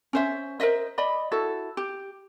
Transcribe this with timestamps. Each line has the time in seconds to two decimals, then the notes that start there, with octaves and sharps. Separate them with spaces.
0.13 C#4 C5 E5
0.60 A#4 C5 D#5 E5
0.98 D5 D#5 B5
1.31 E4 F#4 A4
1.77 G4